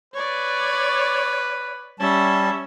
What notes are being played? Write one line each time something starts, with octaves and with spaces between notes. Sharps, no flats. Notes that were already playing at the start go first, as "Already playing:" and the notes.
B4 C#5 D5
G3 C#4 E5 A5